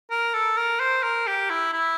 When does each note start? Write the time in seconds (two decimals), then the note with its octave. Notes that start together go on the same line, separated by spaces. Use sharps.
0.11 A#4
0.34 A4
0.57 A#4
0.80 C5
1.03 A#4
1.27 G4
1.50 E4
1.73 E4